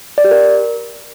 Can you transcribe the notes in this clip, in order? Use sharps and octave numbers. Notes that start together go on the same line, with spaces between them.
D5
G4
A#4